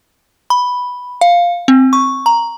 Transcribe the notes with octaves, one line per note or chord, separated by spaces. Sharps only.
B5
F5
C4
C#6
A#5